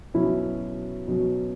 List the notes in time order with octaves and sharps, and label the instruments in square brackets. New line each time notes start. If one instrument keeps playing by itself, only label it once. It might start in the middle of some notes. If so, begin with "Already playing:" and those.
[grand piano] B2 F#3 C#4 [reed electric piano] E4
[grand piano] B2 F#3 C#4